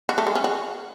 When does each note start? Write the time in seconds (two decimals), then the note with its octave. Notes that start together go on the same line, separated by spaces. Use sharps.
0.09 F#4
0.18 A3
0.27 G#3
0.35 C#4
0.44 F#4